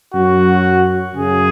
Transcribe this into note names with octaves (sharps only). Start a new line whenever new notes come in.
F#2 F#3 F#4
F#2 C#3 F#3 G#4